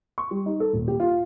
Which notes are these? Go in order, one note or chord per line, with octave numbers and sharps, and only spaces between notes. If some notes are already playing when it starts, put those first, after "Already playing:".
C#6
G3
D#4
A4
D#1
G4
F4